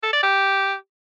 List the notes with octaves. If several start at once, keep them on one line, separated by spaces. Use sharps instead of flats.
A4
D5
G4